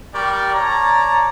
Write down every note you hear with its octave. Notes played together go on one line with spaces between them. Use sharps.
G3 G4 A#4 D5 C#6
C#5 D5 A5 A#5